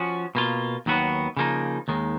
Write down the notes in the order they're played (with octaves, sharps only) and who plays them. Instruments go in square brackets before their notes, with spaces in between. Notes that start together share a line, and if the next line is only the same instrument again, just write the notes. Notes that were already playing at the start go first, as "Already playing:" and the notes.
Already playing: [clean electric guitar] F3 C#4 F#4
B2 A#3 F4
D#2 D#3 F#3 B3 F#4
C#3 F3 A#3 D#4
D#2 D#3 G#3